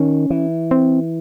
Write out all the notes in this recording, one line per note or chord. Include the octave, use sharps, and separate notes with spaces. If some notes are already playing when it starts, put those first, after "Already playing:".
Already playing: D#3 C#4
E3
C4